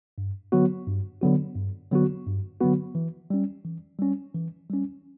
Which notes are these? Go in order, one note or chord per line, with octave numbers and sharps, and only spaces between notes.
G2
D3 F#3 B3 F#4
G2
D3 F#3 B3 F#4
G2
D3 F#3 B3 F#4
G2
D3 F#3 B3 F#4
E3
G3 C#4
E3
G3 C#4
E3
G3 C#4